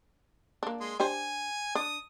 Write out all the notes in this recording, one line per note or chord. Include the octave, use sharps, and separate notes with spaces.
A#3 D4
G#3 C6
D4 G4 C5 G#5
D4 D#6